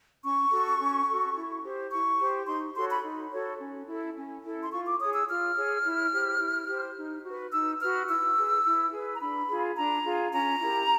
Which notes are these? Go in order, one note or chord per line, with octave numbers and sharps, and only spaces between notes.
C#4 C#6
F#4 A4
C#4
F#4 A4
E4
G4 C5
E4 C#6
G4 C5
D#4 C6
F#4 A4 C#5 C6
B5
D#4
F#4 A4 C#5
C#4
E4 A4
C#4
E4 A4
C6
F4 C#6
D6
G#4 C#5 D#6
E6
F4 F6
G#4 C#5
E4
G4 C5
E4
G4 C5
D#4
F#4 B4
D#4 E6
F#4 B4 F6
E4 E6
G#4 B4
E4
G#4 B4
A#5
D4 B5
F4 G#4
D4 A#5
F4 G#4
C#4 A#5
E4 G4 A#4